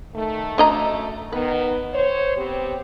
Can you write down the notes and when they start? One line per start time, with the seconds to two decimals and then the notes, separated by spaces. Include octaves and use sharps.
0.14 D#3 A3
0.58 F#2 A3 D4 D#5 A#5
1.32 D#3 B3 B4
1.93 C5 C#5
2.37 B3 C4 G4